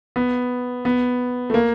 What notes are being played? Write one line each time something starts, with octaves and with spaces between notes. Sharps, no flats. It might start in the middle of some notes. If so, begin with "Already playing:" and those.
B3
B3
A3
A#3